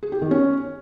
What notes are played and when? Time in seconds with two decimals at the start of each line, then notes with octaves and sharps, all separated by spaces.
0.03 G#4
0.12 G4
0.22 D#3
0.31 C#4